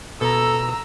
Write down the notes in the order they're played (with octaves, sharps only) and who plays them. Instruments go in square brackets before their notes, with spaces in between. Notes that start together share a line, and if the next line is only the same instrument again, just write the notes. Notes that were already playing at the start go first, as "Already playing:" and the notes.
[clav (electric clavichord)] B2 [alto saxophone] A4 [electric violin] A#5 E6